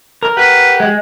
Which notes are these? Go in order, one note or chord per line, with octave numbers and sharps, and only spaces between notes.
A#4
G4 B4 F#5
G#3